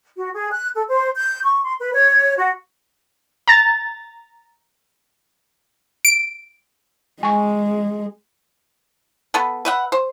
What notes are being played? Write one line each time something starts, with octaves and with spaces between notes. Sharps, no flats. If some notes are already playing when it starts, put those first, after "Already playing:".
F#4
G#4
F#6
A4
C5
G6
C#6
C6
B4
C#5
F#4
A#5 A6
D7
G#3 G#5 C#6
B3 A4 B4
B4 E5 F#5
C5